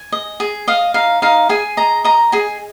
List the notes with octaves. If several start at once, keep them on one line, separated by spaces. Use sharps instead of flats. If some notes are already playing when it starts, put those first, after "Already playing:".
Already playing: G#5
D#5
G#4
D#5 F5
D#4 F5
D#4 F5
G#4 G#5
D#5 A#5
D#5 A#5
G#4 G#5